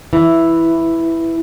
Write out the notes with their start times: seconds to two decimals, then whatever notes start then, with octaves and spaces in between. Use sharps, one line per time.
0.13 E3